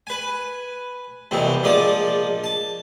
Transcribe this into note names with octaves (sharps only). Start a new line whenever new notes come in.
B4 G#5
C2 F2 B2 E3 C4
A#1 F3 G#3 A#3 D5 D#6
A5